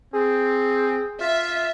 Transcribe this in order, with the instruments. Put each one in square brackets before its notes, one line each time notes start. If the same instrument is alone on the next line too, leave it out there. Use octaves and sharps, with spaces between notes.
[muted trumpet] C4 [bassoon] G#4
[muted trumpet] F4 [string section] E5